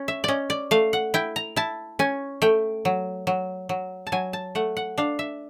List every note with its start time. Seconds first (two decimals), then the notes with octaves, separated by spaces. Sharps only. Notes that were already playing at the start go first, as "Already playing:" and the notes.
Already playing: C#4
0.08 E5
0.24 C#4 D5 D#5
0.50 D5
0.71 A3 F5
0.93 F#5
1.14 E4 G5
1.36 A#5
1.56 E4 A5
1.99 C#4 G#5
2.42 A3 G5
2.85 F#3
3.27 F#3
3.69 F#3
4.07 A5
4.12 F#3 G#5
4.33 A5
4.55 A3 F#5
4.77 F#5
4.98 D4 F5
5.19 E5